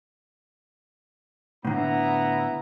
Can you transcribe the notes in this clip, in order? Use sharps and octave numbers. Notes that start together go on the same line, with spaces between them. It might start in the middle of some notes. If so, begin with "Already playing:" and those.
A2 D3 B3 E4 A#5